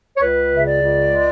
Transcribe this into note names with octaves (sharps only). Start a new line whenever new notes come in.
C#5
C#2 B4
C#3 E5
D5
C#2
G#3